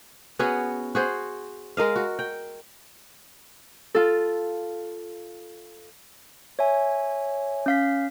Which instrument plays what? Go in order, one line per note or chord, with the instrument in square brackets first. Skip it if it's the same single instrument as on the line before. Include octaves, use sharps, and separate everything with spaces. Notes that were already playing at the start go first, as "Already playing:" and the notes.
[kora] B3 C#4 F#4 G#4
F#4 G#4 C5
G#3 A#4 D#5 F5
F#4
G5
[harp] F4 A4
[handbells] C#5 E5 G#5
C#4 F5 B6